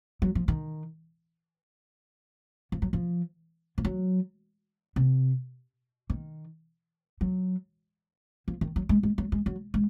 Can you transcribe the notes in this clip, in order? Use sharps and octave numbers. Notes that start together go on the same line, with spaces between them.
F#3
F3
D#3
F3
F#3
F3
F3
F#3
C3
D#3
F#3
F3
D#3
F#3
G#3
G#3
F#3
G#3
F#3
G#3